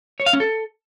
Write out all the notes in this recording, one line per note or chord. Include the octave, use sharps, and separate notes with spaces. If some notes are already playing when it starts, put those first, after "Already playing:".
C#5
F5
C#4
A4